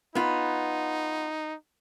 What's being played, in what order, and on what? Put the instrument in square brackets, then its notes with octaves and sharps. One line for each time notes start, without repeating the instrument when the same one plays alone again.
[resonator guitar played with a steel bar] B3 F4 [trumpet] D#4